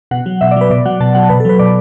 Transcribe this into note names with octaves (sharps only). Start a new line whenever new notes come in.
B2 F#5
F#3
B2 E5
D5
F#3 B4
B2 D5
F#3 F#5
B2 A5
F#3 F#5
B2 B4
A4
F#3 B4
B2 D5